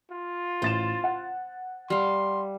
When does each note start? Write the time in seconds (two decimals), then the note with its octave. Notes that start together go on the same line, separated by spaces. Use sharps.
0.11 F4
0.62 A1 C5 A6 E7
1.04 F#5
1.90 G3 F5 C6